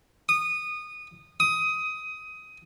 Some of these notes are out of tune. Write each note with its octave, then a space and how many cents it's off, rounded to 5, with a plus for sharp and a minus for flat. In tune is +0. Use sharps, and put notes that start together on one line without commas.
D#6 -20
D#6 +15